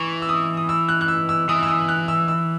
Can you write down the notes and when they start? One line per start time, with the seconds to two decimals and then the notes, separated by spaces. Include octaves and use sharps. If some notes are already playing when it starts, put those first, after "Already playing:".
Already playing: E3 C#6
0.22 E6
0.29 D#6
0.57 D#6
0.69 E6
0.89 F#6
1.01 F#6
1.08 E6
1.29 E6
1.49 E3 D#6
1.63 E6
1.69 D#6
1.88 F#6
2.08 E6
2.28 E6